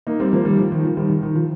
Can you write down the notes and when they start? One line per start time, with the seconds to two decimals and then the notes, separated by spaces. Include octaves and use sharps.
0.07 A#3 D#4
0.20 G3 C4
0.33 F3 A#3
0.45 D#3 G3
0.58 F3
0.72 D#3
0.85 F3
0.97 D#3 G3
1.10 D#3
1.23 D#3
1.36 F3